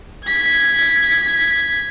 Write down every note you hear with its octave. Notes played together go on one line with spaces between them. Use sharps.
G#6 B6